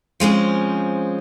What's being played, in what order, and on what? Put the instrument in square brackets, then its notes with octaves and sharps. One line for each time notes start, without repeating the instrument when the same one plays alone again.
[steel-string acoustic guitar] F3 G#3 C4 C#4